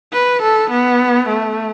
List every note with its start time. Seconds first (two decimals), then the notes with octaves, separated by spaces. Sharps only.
0.13 B4
0.42 A4
0.70 B3
1.28 A3